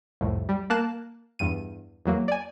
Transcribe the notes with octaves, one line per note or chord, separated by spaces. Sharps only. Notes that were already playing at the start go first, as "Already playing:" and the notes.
C2 F2 A2
G3
A#3 A5 F#6 E7
E2 G2 D#7
E2 F#3 A#3
D5 G#5